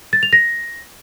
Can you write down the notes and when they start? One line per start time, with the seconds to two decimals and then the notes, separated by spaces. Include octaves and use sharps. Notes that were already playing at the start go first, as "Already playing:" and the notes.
0.13 A6
0.23 F7
0.33 A#6